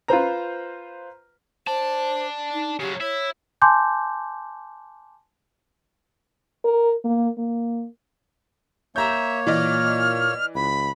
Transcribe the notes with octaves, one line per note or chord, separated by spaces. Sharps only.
F4 B4 C5 A#5
C5 D5 A5
D#4
C#3 F#3 G4
E4 C#5
G#5 A5 C6 D6 G6
A#4
A#3
A#3
A#3 C#5 E5 A#5 G6
A#2 E3 D5 D#5 F6
C#2 B5